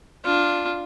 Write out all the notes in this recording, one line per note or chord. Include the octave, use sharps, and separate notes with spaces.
D4 F4